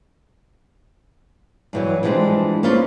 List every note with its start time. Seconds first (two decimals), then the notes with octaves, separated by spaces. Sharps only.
1.73 G2 E3 F#3
2.03 E3 F3 G3 G#3 C4 D4
2.63 A#3 C4 C#4 F4 B4 D5